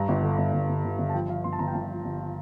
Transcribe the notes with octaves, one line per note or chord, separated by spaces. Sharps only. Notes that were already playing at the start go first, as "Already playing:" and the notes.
Already playing: G2 A#5
G1
D3
G1
G1
G1
G1
G1
A5
F3 G5
F3 F5
G1 C6
A5
G1 A#5
G5
G1 A5
F3
G1